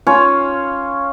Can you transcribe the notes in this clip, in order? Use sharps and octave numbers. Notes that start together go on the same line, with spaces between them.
C#4 F4 C#5